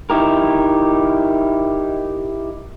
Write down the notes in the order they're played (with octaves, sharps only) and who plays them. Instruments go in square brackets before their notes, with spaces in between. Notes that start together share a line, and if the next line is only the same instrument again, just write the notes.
[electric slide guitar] D#4 E4 G4 A#4